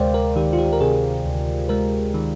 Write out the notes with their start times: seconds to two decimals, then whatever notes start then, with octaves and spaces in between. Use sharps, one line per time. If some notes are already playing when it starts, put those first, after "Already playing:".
Already playing: D2 C3 G#3 A#4 C5 D5 F5 G5
0.14 A#4
0.36 D#3 G4
0.53 F4
0.59 G4
0.73 A#4
0.81 C3 G#4
1.25 D2
1.69 G#3 A#4
2.14 D#3